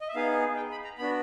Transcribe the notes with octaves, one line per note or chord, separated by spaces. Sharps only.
D#5
E5
B3 D#4 G#4 F5
G5
B5
A#5
B3 D4 F#4 B5